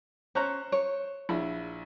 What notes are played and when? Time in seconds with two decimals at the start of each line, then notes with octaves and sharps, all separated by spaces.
0.35 C#4 C5 A#5 C#6 F#6
0.72 C#5
1.29 A#1 E4